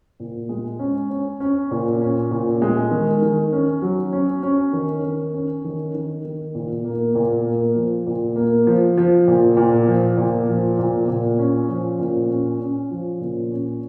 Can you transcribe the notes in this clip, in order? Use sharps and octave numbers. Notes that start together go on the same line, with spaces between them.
A#2
G#3
C#4
C#4
C#4
A#2
C#4
A#2
G#3
D#3
D#3
C#4
F#3
C#4
C#4
D#3
D#3
C#4
D#3
D#3
D#3
A#2
A#3
A#2
A#3
F3
A#2
A#3
F3
F3
A#2
A#2
F3
A#2
F3
A#2
A#2
C#4
F3
A#2
C#4
C#4
F3
A#2
C#4